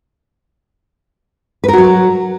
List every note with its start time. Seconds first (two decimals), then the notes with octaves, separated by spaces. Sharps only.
1.64 B4
1.68 A#4
1.73 F#4
1.78 F#3